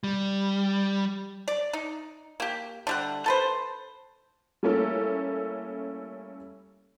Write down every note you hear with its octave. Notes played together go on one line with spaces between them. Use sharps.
G3
D5
D#4
A#3 G4
D3 G3 F#5
A4 B4 C5
G3 A3 A#3 C#4 E4 A4